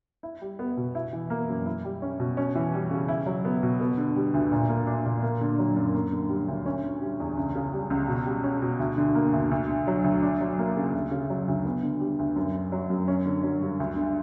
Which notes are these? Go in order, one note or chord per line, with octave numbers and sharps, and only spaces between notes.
E4
G3
B3
B2
E4
E3
A#3
F#2
E4
G3
C#4
B2
C#4
E3
G3
C#3
E4
F#3
B3
B2
B3
D3
G3
D2
A#2
A#3
D4
A#2
A#3
D3
F#3
F#2
A#3
D3
G3
D2
C#4
D3
G3
E2
C#2
C#3
G3
C#2
B2
G3
C#4
B2
D2
D3
A#3
D2
D2
D3
F#3
D2
D4
F#3
A#3
C#3
D2
C#3
F#3
D2
B3
D3
G3
D2
F#2
D3
F#3
F#2
C#4
D3
F#3
G2
D2
D3